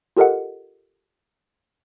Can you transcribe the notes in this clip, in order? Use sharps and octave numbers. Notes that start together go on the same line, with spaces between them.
F4 G4 A4 A#4 D#5 F#5